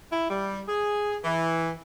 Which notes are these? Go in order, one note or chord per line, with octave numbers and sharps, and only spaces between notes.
E4
G3
G#4
E3